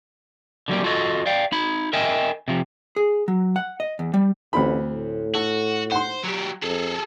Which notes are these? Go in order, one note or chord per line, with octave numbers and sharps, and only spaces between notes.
D3 F#3 G3 A#3
F4 F#4 A4 C#5 D#5
D5 F5 G5
D#4 B5
A#4 D#5 E5 G5 G#5
C3 F3
G#4
F#3
F#5
D#5
E2
G3
A1 D2 C4 B5
A2
F#4 A4
C5 F#5 C6
F#3 G4
F2 G#4 A4